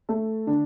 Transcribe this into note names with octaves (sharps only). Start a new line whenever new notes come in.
A3 A4
D3 D4